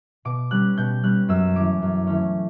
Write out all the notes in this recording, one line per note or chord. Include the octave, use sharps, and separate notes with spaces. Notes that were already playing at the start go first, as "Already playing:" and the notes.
B2 D6
G3 C#4 F#6
B2 G6
G3 C#4 F#6
F#2 E6
E3 A3 C#4 D6
F#2
E3 A3 C#4